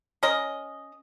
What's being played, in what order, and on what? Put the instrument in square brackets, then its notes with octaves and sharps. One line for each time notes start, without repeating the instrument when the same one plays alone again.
[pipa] C#4 A#4 D#5